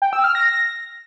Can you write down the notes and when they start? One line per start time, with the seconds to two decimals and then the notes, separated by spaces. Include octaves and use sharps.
0.02 G5
0.13 E6
0.24 F6
0.35 A#6